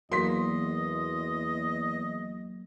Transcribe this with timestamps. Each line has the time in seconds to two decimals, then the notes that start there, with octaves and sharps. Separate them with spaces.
0.12 E2 F#3 A#3 D#5 C6 B6